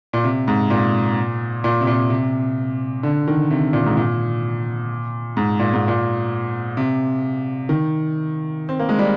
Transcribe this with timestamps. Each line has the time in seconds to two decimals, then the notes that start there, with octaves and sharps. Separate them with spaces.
0.13 A#2
0.24 C3
0.48 G#2
0.70 A#2
1.64 A#2
1.81 C3
1.87 A#2
2.10 C3
3.03 D3
3.28 D#3
3.50 C3
3.73 A#2
3.86 G#2
3.97 A#2
5.37 G#2
5.59 A#2
5.73 G#2
5.88 A#2
6.77 C3
7.69 D#3
8.69 C4
8.80 A#3
8.89 G#3
8.99 G3